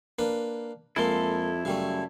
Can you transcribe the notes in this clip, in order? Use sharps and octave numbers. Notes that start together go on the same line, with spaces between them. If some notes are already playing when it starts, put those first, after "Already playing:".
A#3 D4 B4
F2 G#3 A#3 E4 A4 C6
F#2 C#3 G3 A3